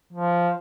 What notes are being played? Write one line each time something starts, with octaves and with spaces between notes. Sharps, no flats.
F3